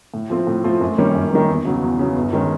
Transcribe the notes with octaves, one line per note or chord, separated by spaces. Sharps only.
A2
F3 A3 C4 F4
A2
F3 A3 C4 F4
F#2
D#3 G3 A#3 C#4
F#2
D#3 G3 A#3 C#4
E2
C#3 F#3 B3
E2
C#3 F#3 B3
G1
D#3 G#3 C#4